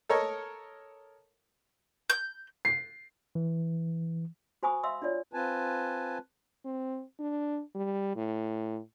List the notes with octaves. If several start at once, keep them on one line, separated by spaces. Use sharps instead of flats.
A4 A#4 C#5 D#5
G6
C7
E3
F#4 C5 G#5 B5 C#6 D#6
E5 F5 C6 E6
D4 F4 C#5 D5
C4 F4 B4 G#5 A5
C4
D4
G3
A2